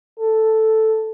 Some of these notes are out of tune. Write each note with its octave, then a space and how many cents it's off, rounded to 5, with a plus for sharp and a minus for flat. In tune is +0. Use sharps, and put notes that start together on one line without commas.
A4 +0